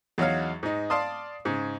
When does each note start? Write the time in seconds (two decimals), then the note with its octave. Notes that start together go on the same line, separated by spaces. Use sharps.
0.18 E2 F#3 D#4 C#5 F5
0.63 G#2 D#4
0.90 D5 F5 A5 C6 D#6
1.45 G#2 C#3